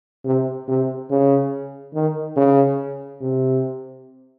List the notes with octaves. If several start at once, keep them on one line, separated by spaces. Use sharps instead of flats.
C3
C3
C#3
D#3
C#3
C3